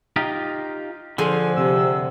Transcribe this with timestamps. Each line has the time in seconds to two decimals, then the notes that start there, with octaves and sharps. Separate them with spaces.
0.16 D#4 F4 G4
1.18 D3 F3 G#4 A4
1.56 C3 E6